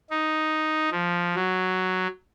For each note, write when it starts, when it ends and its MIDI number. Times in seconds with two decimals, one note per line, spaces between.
0.10 0.89 63
0.91 1.36 53
1.36 2.08 54